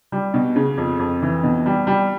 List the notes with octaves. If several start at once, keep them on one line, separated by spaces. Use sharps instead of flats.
G3
B2
C#3
F2
F2
E3
B2
G3
G3